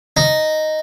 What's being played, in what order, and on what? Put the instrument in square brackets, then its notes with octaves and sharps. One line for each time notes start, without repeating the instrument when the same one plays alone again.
[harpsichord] D#4